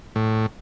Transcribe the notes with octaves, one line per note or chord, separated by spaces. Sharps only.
A2